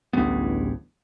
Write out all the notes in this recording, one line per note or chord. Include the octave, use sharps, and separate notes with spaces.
D1 A1 G2 B3